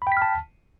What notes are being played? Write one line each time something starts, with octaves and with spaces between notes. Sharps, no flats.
G5 A5 B5 F6 B6